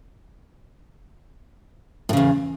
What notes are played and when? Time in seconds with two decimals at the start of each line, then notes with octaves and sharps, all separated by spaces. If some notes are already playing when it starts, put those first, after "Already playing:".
2.09 A2
2.13 C#3
2.17 E2